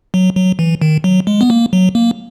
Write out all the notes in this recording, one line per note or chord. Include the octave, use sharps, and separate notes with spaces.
F#3
F#3
E3
D#3
F#3
G#3
B3
A#3
F#3
A#3